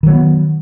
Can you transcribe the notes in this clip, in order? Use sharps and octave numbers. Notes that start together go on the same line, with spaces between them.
D#3 F#3 A#3 B3